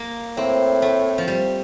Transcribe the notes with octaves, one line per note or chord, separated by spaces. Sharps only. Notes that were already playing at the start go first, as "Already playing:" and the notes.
Already playing: A#3
A2 C4
A3
F3
G3